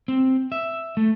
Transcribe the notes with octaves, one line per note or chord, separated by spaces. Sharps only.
C4
E5
A3